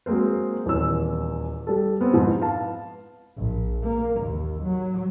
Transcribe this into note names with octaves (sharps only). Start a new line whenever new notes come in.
F#3 G#3 A#3 C4 C5
D#1 E2 C#5 E6
G3 A4
B3 C4
F2 G#2
B4 F5 A5
A#1
A#3
D#2
F#3